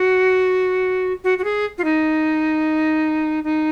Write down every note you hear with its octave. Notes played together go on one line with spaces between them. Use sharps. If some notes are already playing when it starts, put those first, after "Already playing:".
Already playing: F#4
F#4
F#4
G#4
F4
D#4
D#4